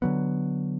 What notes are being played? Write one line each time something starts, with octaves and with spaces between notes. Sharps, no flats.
D3 F#3 B3